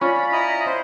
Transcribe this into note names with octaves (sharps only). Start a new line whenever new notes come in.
C#4 F4 D5 F5 B5 F6
E4 D#5 A#5
C5